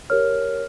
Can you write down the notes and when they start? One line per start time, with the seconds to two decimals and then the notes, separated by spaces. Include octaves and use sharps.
0.10 G4 A#4 C#5 F6